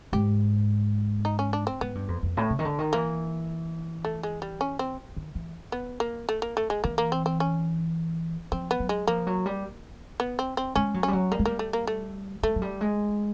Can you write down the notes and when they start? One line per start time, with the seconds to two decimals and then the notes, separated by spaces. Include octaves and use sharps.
0.13 G#2 G4
1.25 D#4
1.39 C#4
1.53 D4
1.67 C4
1.81 G#2 B3
1.95 G2
2.08 F2
2.23 F2
2.37 A2
2.50 C#3
2.59 D#3
2.65 D3
2.79 D#3
2.93 E3 A#3
4.05 A3
4.23 G#3
4.42 G3
4.61 C#4
4.79 C4
5.16 D#3
5.35 E3
5.72 B3
6.00 A#3
6.29 A3
6.42 A#3
6.57 A3
6.70 G#3
6.84 E3 A#3
6.98 A#3
7.12 C4
7.26 C4
7.40 C#4
8.52 F3 C4
8.71 B3
8.80 F#3
8.89 G#3
9.07 F3 A#3
9.27 F#3
9.46 G3
10.20 B3
10.39 C4
10.57 C4
10.75 G#3 C#4
10.94 F#3
11.03 G3 C#4
11.13 F#3
11.32 G3 A#3
11.39 G#3
11.45 G3 A#3
11.59 A3
11.73 A#3
11.87 A3
12.43 G#3 A3
12.56 F#3
12.62 G3
12.81 G#3